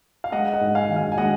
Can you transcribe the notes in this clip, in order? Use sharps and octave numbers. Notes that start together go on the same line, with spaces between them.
F5
G#3 D#5 F#5
D#5 F#5
G#2
F5 G#5
D#3
F5 G#5
G#5
G#3 D#5 F#5